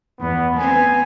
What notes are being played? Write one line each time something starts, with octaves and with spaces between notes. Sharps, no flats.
E2 B3
B3 C4 G#5